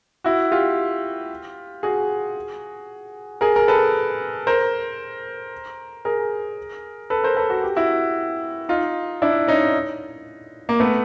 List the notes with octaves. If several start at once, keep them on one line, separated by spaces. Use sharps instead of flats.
E4 F#4
F4 G4
F#4 G#4
G#4 A#4
A#4
A4 B4
A#4 C5
G#4 A#4
A4 B4
A#4 C5
A4 B4
F#4
G4
E4 F#4
D#4 F4
D4 E4
C#4 D#4
A#3
A3 B3